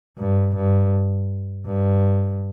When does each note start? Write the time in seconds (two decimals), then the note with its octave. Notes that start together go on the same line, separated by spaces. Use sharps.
0.18 G2
0.55 G2
1.67 G2